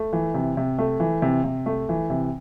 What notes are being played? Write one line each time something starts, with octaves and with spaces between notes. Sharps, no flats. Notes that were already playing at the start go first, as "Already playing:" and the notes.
Already playing: A3
E3
C3
C3
A3
E3
C3
C3
A3
E3
C3